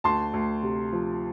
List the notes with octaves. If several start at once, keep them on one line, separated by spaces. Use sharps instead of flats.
D2 A5 C6
D2
C3
F3